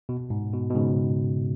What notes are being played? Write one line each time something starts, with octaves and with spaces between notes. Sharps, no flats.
B2
G#2
B2
B2
G#2 C#3